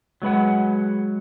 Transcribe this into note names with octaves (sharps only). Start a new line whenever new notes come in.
F#3 G#3 B4 F#5